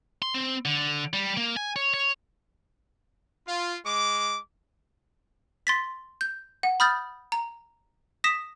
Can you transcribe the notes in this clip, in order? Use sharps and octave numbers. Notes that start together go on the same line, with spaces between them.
C6
C4
D3
G3
A#3
G#5
C#5
C#5
F4
G#3 D6
C6 A6 B6
G6
F#5
B5 D#6 F6 G6 A6
A#5
D#6 A#6 B6 E7